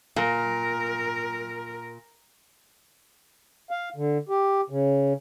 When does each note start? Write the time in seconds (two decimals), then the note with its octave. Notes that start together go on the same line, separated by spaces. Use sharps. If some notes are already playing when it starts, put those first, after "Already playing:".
0.16 A#2 A#4
3.71 F5
3.96 D3
4.29 G4
4.70 C#3